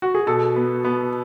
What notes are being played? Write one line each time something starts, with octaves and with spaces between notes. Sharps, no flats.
F#4
G#4
B2 A4
B3
B3